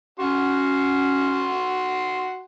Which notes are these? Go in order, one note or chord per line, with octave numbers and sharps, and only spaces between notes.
C#4 F#4 F#5 C6